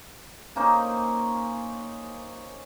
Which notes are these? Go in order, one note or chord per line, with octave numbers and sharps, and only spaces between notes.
A#3 C#4 D#4 C5